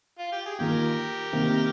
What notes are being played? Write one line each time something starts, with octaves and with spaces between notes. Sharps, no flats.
F4
G4
G#4
D#3 A#3 F4 G4 A#4
C3 D#3 A#3